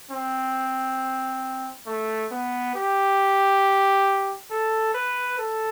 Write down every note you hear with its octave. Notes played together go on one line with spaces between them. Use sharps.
C4
A3
B3
G4
A4
B4
A4